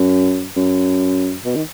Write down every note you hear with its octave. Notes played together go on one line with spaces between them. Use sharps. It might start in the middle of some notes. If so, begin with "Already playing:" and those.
Already playing: F#2
F#2
B2
D#3